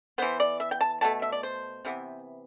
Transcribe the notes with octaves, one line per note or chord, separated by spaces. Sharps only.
E3 B3 C5
D5
E5
G5
A5
B2 A3 A5
E5
D5
C5
C3 E3 B3